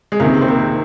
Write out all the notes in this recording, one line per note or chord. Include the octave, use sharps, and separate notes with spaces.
G#3
C#2 C3 D#3 A#3
C4
A#3